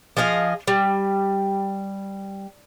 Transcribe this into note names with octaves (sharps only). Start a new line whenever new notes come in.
F3 G#4 D#5 F5
G3